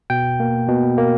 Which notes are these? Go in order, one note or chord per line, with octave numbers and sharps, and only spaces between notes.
B2 G5
A#3
B2
A#3